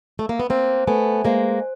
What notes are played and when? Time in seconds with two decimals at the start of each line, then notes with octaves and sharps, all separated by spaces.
0.19 A3
0.29 A#3
0.40 B3
0.50 A#3 C4 C5
0.87 A3 B3 G#5
1.25 G#3 A#3 C5